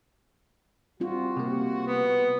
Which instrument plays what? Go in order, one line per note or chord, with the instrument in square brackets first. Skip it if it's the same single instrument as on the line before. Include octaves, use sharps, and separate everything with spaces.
[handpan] G3 C4 F4 [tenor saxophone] F#4
[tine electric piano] C3 A#3
[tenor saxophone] B3